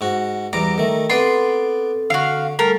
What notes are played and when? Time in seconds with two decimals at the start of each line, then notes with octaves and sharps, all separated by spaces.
0.01 G#2 F#4
0.53 E2 G3 A#5 D6
0.78 D#3 A3
1.10 B3 C4 A4 B4 D5 C6
2.10 D3 F#4 F5
2.59 G3 A3 A4 A#4